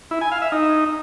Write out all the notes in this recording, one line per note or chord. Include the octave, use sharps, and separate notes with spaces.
E4
G#5
F5
E5
D#4